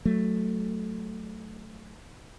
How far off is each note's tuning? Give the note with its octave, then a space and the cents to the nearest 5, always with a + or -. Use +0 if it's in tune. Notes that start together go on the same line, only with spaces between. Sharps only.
F#3 +5 A3 +0